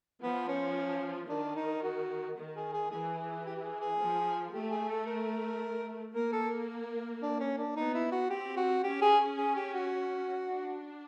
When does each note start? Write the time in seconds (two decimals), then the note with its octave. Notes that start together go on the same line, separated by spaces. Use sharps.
0.22 F3 B3
0.48 C#4
1.29 D#3 D4
1.56 D#4
1.83 F#4
2.37 D#3
2.55 G#4
2.73 G#4
2.91 E3 G#4
3.18 G#4
3.45 G4
3.57 G4
3.63 G#4
3.81 G#4
3.99 F3
4.53 A3 G4
4.71 G#4
4.89 A4
5.06 A#4
6.14 A#3 A#4
6.33 A4
7.22 D4
7.40 C#4
7.58 D4
7.76 B3 D#4
7.94 E4
8.12 F#4
8.30 C4 G4
8.57 F#4
8.84 C#4 G4
9.02 G#4
9.38 G#4
9.56 G4
9.74 F#4
10.46 D4